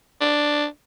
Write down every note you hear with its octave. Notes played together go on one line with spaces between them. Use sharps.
D4